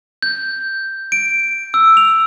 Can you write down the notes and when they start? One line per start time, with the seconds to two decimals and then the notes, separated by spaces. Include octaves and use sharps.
0.22 G6
1.12 D7
1.74 E6
1.97 F7